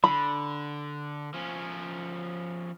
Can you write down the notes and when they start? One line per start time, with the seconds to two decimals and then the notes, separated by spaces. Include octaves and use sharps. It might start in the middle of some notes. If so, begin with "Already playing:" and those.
0.04 D3 B5
1.34 F3 C#4